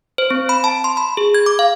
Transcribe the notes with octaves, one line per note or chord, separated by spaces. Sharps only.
C5
C4
B5
A5
C6
B5
G#4
G#6
D6
F5